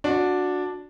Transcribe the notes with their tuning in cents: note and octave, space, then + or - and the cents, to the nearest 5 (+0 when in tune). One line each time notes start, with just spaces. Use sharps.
D4 +0 F#4 -20